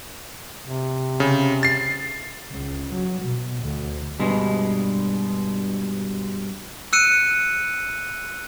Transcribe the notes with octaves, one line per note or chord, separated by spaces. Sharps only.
C3
C#3
A6 C7
C#2
F#3
B2
D2
G2 B2 G#3
E6 F#6 C#7 D#7